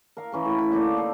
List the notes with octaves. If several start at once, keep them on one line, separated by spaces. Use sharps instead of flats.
A#4 F5
E3 C#4 A#4
A2 B4
B5
D3 A#3 D#4 D5
A4 F5